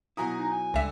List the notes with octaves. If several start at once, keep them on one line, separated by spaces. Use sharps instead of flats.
B2 F#3 E4 G#5 A#5 D#6
D#4
G#5
C#2 D3 G3 E5